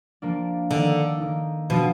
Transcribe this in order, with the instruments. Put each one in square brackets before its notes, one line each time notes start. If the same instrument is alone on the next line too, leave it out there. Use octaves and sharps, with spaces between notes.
[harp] F3 A#3 D4
[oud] D3 [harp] D#3 A#3 D#4
[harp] D#3 A#3 D#4
[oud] B2 [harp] F3 B3 D4